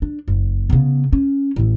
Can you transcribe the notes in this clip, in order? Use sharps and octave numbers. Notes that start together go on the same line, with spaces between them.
D4
F#1
C#3 B3
C#4
A1 E3